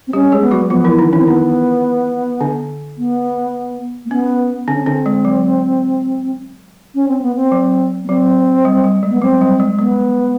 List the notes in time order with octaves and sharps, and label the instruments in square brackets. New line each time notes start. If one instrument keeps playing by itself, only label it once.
[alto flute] C4
[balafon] G3 G4 [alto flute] C#4
[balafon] G#3 G#4
[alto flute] B3
[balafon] F#3 F#4
[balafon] F3 F4 [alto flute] B3
[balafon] E3 E4
D#3 D#4
[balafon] E3 E4 [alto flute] C#4
[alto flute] C4
[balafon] D#3 D#4 [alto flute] B3
[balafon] D3 D4
[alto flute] B3
A#3
[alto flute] B3 [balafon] C#4
[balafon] D3 D4 [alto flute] C4
[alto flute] C#4
[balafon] D3 D4 [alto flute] C4
[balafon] G#3
F#3
[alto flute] C#4
C4
B3
C4
[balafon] F#3
[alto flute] B3
[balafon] F#3 [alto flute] C4
[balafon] G3
G3
G#3
[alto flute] B3
[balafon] F#3 [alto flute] C4
[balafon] G3
G#3
[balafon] G#3 [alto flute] B3